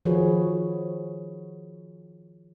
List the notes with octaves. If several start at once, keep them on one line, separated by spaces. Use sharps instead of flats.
D#3 F3 F#4 G#4 B4 C#5